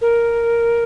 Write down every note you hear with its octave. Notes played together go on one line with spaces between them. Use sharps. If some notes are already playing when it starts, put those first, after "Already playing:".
A#4